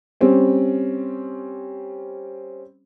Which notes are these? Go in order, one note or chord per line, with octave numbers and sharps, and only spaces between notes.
G3 C4 C#4